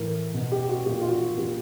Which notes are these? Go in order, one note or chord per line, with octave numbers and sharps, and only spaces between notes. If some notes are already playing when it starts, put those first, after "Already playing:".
Already playing: A2 E3 A#4
B2
G4
F#4
A#2 G4
F#4
F4
F#4
A#2 G4